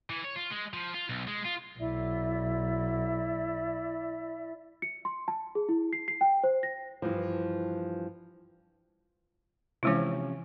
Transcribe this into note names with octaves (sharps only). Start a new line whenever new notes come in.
E3
C#5
F4
G#3
F3
F4
B1
G#3
F4
B1 E4 D5 E5
C#7
C6
A5
G#4
E4
C7
C7
G5
C5
A#6
G2 B2 E3 F3
C3 E3 F3 G#3 C#4 E4